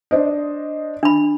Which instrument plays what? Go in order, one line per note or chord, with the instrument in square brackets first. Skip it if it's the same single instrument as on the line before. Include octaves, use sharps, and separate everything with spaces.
[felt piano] D4 C5 D#5
[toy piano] D4 B5